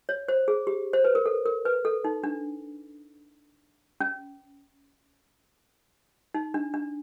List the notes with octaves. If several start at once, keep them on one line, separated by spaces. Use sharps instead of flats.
C#5
C5
G#4
G4
C5
B4
A#4
A4
A#4
B4
A4
D#4
D4
C#4
D#4
D4
D4